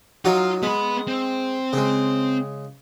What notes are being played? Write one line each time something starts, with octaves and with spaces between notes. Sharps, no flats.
F#3 D#4 F4 F#4
G#3 B3 B5
C4
C#3 G#3